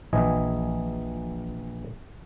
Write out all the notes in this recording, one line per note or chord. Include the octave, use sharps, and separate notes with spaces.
A#1 E3 D#5 G#5